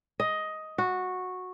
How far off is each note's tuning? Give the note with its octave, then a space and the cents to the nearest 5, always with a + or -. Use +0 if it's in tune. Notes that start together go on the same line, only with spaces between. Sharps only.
D#5 +10
F#4 -10